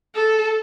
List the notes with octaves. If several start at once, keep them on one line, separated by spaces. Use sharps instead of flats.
A4